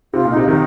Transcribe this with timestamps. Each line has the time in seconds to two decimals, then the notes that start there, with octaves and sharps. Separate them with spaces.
0.13 C3 F4
0.25 A#2
0.30 D#4
0.37 C3
0.48 C3 D#3 D#4